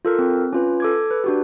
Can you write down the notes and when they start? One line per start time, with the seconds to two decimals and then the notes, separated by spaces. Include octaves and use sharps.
0.05 F4 A4 A#4
0.19 C4
0.53 C#4 F4 B4
0.80 A4 D6 G#6
1.11 B4
1.24 D4 F#4 G4